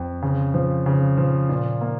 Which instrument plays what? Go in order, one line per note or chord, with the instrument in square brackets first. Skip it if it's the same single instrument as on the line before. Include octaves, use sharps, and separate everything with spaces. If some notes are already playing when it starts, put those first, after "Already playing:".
Already playing: [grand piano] F2
C#3
F3
C#3
F3
A#2
A#3